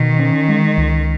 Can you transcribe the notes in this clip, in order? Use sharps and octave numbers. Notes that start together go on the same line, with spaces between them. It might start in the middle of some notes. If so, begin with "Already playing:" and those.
Already playing: B2 D#3
C#4
G#3
C#2